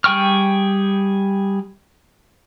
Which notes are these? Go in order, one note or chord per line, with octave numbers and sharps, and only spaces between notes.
G3 G#4 G5 C#6 F6